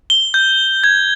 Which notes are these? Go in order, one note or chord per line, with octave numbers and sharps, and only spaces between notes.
G7
G6
G#6